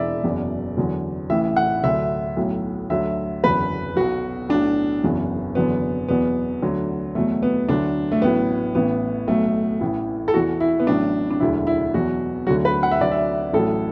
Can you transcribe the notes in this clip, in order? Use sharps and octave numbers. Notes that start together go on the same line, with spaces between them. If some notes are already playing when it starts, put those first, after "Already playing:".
Already playing: E1 E2 E3 D5 E5
F#1 E2 B2 F#3
E2 D3 F#3
A1 A2 E3 E5
F#5
D2 D3 F#3 E5
B1 A2 F#3
D2 D3 F#3 E5
F#1 E2 D3 F#3 B4
B1 B2 F#3 F#4
B1 A2 F#3 D4
F#1 E2 B2 F#3
F#1 E2 D3 F#3 B3
E2 B2 F#3 B3
D2 D3 F#3
E2 B2 F#3 A3
B3
D2 D3 F#3 D4
A3
A1 A2 F#3 B3
A1 A2 E3 B3
B1 B2 F#3 A3
A1 A2 E3
A4
E2 E3 F#4
E4
B3
A1 A2 F#3 D4
D4
E1 D2 D3 F#3 E4
E4
E2 B2 F#3 F#4
D2 D3 F#3 F#4
B4
F#5
E5
D2 D3 F#3 D5
E5
A1 A2 F#3 A4